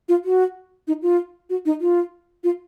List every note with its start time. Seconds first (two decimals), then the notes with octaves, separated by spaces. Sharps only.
0.09 F4
0.25 F#4
0.88 D#4
1.02 F4
1.50 F#4
1.66 D#4
1.81 F4
2.44 F4